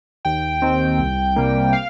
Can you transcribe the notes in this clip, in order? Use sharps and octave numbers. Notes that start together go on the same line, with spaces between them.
D#2 G5
D#3 C4
C2
C3 G3 A#3
F5